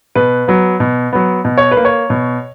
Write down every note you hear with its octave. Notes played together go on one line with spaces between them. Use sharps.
B2 B4
F#3 B3
B2
F#3 B3
B2
C#5
B4
A#3
C#5
B2